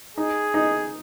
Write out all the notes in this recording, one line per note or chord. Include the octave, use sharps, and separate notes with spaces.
D#4 G#4
D#4